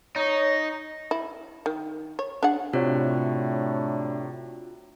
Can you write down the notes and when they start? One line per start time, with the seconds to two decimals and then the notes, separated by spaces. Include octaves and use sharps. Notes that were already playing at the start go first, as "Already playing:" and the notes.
0.16 D#4 C#5
1.11 E4
1.66 D#3
2.19 C#5
2.43 D4 G#4 F#5
2.73 A2 C3 D4 F4 F#4 C#5 F#6